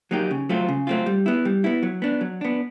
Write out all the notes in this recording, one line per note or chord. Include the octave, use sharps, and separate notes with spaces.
F#3 A#3 D#4 G4
C#3
F#3 A3 C4 F4
C#3
F#3 A3 C4 F4
G3
B3 E4
G3
B3 E4
F#3
B3 D4
F#3
B3 D4